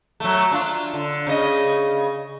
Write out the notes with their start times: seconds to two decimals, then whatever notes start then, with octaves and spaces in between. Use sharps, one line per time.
0.20 F#3 A3
0.51 D4 F4
0.94 D3
1.27 C#3 D#5